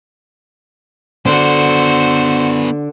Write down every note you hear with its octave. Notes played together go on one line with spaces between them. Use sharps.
D3 B3 F#4 C5 D5